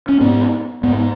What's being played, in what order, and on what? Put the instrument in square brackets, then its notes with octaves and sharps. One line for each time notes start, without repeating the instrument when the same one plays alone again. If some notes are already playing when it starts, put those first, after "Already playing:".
[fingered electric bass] C#4
G#2 B3
G#2 B3